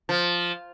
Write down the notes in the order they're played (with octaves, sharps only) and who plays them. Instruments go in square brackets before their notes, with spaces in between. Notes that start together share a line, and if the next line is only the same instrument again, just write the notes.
[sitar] F3